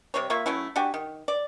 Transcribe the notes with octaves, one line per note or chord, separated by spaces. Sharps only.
C3 G3 C4 C#5
A#3 F4 E5 C#6
F#3 A3 C#4 E4
D4 F#4 G4 G#5
D#3
D5